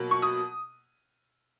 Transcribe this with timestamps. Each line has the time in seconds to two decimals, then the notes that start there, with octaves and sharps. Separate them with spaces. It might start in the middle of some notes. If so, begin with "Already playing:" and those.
Already playing: B2 F#3 A#3
0.11 C#6
0.22 D#6